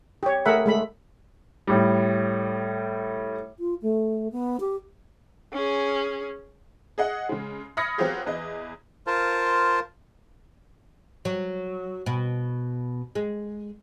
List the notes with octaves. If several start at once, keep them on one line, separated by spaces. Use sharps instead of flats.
G4 C#5
A3 G#4 A#4 E5 F#5 B5
G#3 A3 B5
A2 G3
F4
A3
B3
G4
C#4 G#4
G#4 D#5 F#5
C#3 G#3
B5 D#6 F6 G#6 A#6 C#7
F#3 B3 C4 F4 G4 G#4
E2 B4 D#5
F4 A#4 C5 A5
F#3
B2
G#3